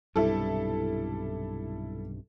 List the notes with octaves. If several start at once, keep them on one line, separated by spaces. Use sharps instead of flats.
B1 G2 C3 G3 E4 A4